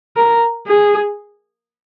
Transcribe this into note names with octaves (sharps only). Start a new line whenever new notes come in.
A#4
G#4